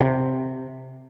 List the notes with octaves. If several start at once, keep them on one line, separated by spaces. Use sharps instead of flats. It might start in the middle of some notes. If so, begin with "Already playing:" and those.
C3